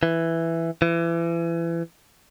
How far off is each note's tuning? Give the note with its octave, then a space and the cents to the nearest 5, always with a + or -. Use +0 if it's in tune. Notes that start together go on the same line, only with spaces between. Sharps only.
E3 +5
E3 +30